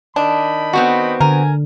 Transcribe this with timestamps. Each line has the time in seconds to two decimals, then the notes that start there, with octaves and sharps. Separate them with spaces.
0.16 D#3 D4 D#5 B5
0.73 B3 C4 F#4
1.21 D3 A#4 G#5